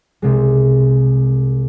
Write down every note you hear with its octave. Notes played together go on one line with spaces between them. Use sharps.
C2 C3 G#3